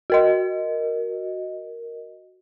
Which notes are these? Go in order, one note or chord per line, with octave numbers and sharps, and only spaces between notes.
F#4 A#4 D#5